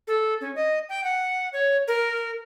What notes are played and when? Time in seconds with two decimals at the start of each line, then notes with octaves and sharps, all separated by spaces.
0.07 A4
0.41 C#4
0.55 D#5
0.89 G5
1.04 F#5
1.53 C#5
1.88 A#4